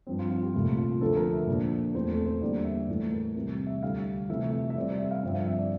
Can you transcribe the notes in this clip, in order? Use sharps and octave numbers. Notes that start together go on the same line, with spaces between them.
G2 F3 C4
F4
F4
G4
C2 A#2 A3 F4
F4
D2 D3 F3 A4
A#4
E5
A#2 F3 A#3 D4
E2 E3 A3 C4 C5
A4
C5
E2 D3 G3 A#3 D5
E5
A2 E3 A3
A#4
C2 C3 E3 G3
E5
D2 D3 G3 F5
F2 C3 E3 A3 C4 E5
E5
E5
C3 G3 C4 D5
D5
E5
F5
G2 D3 F3 C4 E5
F5
E5
D5